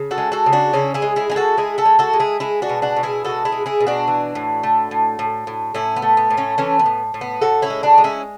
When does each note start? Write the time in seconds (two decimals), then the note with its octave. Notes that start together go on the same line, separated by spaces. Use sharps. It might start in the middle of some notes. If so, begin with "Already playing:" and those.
Already playing: C#3
0.11 F#4 A4
0.18 G#3
0.32 F#4 A4
0.46 C#3
0.53 D4 F#4
0.73 C#3 C#4 E4
0.94 E4 G#4
1.02 G#3
1.16 E4 G#4
1.30 G#3 G#4
1.36 F#4 A4
1.57 G#3 E4 G#4
1.78 F#4 A4
1.85 G#3
1.99 F#4 A4
2.13 G#3
2.20 E4 G#4
2.40 G#3 E4 G#4
2.62 D4 F#4
2.69 B2
2.82 D4 F#4
2.96 B2
3.03 E4 G#4
3.24 G#3 F#4 A4
3.45 E4 G#4
3.52 G#3
3.66 E4 G#4
3.80 B2
3.87 D4 F#4
4.08 E3
4.35 A2
4.63 A3
4.91 A2
5.19 A2
5.47 A2
5.74 A2 C#4 E4
5.96 B3
6.02 A3
6.17 B3
6.31 A2
6.37 A3 C#4
6.58 E3 A3 C#4
6.79 B3
6.86 A2
7.14 A2
7.21 B3
7.42 A2 F#4 A4
7.62 C#4 E4
7.70 G#3
7.83 D4 F#4
7.98 G#3
8.04 C#4 E4